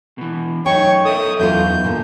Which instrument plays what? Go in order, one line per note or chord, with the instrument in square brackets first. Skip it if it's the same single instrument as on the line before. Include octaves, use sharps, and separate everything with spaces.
[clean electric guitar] B2 E3
[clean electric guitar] F#2 D#4 [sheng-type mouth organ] C#5 C#6 [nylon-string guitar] G5
[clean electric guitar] A4 A#4 E5 [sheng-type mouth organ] D#6
[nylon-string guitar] E2 E3 F4 [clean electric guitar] F#3 B3 [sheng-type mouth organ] G6
[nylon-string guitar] A#2 D3